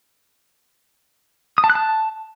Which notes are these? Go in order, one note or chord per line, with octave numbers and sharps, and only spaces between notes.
D#6
A5
F#6
A5